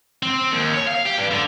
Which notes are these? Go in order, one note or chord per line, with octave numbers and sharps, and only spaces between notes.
C4
D#2
C#5
F5
G4
G2
D3